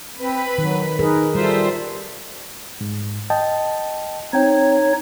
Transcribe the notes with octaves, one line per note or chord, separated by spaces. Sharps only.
C4 B4 B5
D#3 F#3
D#4 G#4 A#4 B4
G3 F4 A4 C5 E5
G#2
D#5 G5 A5
C4 D#4 C#5 G5